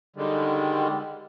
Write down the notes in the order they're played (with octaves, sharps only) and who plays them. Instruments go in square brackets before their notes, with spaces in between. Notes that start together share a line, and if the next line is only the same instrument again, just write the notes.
[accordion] D3 D#3 G3 G#3